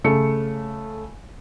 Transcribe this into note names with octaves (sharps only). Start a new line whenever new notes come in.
C#3 A3 C#7